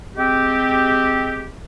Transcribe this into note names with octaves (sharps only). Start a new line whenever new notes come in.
G#3 C4 G4